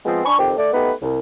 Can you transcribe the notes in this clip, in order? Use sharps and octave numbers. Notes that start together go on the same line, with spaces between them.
F3 G#3 B3 C4
D4 G#5 B5 C#6
F2 D#3 C4 G4
A3 D5
A3 B3 D#4 G4 B4
C2